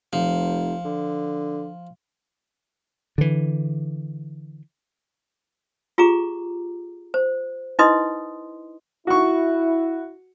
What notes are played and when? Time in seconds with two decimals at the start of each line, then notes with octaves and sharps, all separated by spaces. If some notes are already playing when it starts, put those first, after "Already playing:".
0.13 F1 F3
0.85 D3
3.18 D3 E3
5.98 F4 G4 G#4 A#5 D6
7.14 C5
7.79 D#4 E4 B4 D#5 C6 D#6
9.07 E4 F#4 C#6